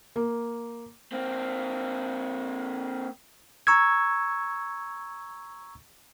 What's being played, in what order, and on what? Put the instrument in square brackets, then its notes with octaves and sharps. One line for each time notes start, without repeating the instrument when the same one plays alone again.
[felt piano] A#3
[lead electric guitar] A#3 C4
[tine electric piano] A#5 C#6 E6 G#6